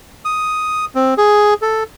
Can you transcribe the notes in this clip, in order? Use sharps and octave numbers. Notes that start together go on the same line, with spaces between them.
D#6
C4
G#4
A4